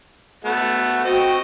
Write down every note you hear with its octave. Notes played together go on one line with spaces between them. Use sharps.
A3 B3 F#4
C4 F#4 D#5 G5